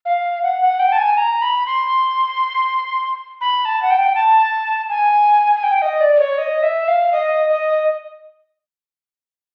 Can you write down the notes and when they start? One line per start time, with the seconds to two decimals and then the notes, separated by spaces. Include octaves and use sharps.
0.05 F5
0.43 F#5
0.62 F#5
0.79 G5
0.92 A5
0.98 G#5
1.17 A#5
1.42 B5
1.66 C6
3.41 B5
3.65 A5
3.82 F#5
3.90 G5
4.15 A5
4.89 G#5
5.56 G#5
5.63 G5
5.82 D#5
6.00 D5
6.16 D5
6.19 C#5
6.38 D#5
6.63 E5
6.88 F5
7.12 D#5
7.50 D#5